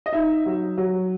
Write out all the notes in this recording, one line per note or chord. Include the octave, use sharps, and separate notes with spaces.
D#5
D#4 E5
F#3
F#3